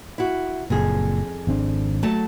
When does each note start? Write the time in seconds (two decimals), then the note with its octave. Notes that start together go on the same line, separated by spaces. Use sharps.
0.18 E4 F#4
0.70 F#1 F2 A#2 G#4
1.47 G#1 C4 D4
2.03 F#3 A3 A5